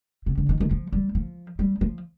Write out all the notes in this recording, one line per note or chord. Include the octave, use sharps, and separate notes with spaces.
C3
D3
D#3
D#3
F3
G3
F3
G3
F3